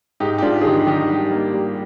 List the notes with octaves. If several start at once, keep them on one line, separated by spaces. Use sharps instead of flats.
G#2 D#4 G4
G4
G#2 D4 F4
G#4
D#3 D#4 G4
D#3 D#4 G4
G3
A#3
G3